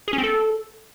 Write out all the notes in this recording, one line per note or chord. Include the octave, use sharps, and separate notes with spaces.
G#4
C#4
C4
A4